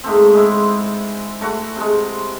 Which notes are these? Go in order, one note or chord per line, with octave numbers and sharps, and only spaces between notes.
G#2 A3 C4
G#3 E4
A3 F#4 F#5
C3 G#3